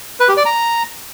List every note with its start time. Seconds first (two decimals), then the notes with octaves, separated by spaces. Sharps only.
0.20 B4
0.28 G4
0.37 D5
0.46 A#5